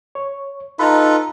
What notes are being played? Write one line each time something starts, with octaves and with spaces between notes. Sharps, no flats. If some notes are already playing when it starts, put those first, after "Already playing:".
C#5
D#4 F4 A4 B4 A#5 B5